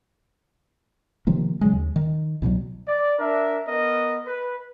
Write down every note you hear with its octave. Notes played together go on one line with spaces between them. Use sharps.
C3 D#3 F3 A#3
C#3 F#3 G#3
D#2
D#3
C2 B2 E3 F#3
D5
D4 A#4 E5
B3 A#4 D#5
B4